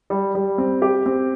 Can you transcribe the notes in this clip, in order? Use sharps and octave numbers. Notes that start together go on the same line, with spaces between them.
G3
G3
C4
G4
C4